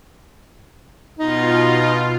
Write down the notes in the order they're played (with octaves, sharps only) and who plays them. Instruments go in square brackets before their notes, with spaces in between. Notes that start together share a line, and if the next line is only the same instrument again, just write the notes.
[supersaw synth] B2 F4 [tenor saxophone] D#4